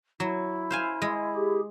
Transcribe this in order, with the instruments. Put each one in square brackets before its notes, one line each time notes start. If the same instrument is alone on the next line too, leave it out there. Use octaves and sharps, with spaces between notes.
[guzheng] F#3 [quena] E4
[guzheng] C5 F5 G#5
G#3
[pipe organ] G4 G#4